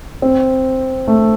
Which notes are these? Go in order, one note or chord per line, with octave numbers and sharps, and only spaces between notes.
C4
A3